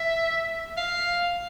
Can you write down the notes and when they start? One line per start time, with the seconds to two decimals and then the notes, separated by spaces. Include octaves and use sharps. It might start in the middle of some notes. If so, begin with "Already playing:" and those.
Already playing: E5
0.77 F5